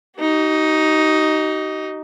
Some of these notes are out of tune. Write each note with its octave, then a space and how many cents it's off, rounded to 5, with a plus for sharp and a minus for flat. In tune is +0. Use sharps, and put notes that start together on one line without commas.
D#4 +5 G4 -45